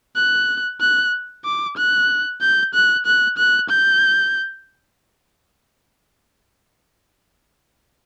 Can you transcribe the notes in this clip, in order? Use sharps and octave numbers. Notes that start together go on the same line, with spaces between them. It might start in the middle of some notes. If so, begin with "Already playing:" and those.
F#6
F#6
D6
F#6
G6
F#6
F#6
F#6
G6